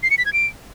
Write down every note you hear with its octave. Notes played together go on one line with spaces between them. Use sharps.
C7
C#7
B6
G#6
D7